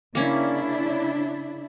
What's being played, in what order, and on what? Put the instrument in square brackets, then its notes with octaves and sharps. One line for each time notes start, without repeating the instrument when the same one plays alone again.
[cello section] C#3 D4 E4 [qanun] A#3 C#4